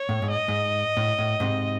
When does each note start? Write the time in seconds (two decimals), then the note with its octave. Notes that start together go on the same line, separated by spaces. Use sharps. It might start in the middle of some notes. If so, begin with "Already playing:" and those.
Already playing: C#5
0.09 A2
0.22 G#2
0.30 D#5
0.48 G#2
0.97 A2
1.18 A2
1.40 G#2 C3